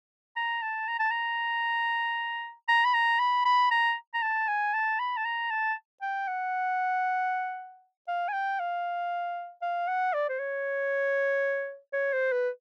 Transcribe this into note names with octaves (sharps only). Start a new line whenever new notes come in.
A#5
A5
A#5
A5
A#5
A#5
B5
A#5
B5
B5
A#5
A#5
A5
G#5
A5
B5
A5
A#5
A5
G5
F#5
F5
G#5
G5
F5
F5
F#5
D5
C5
C#5
C#5
C5
B4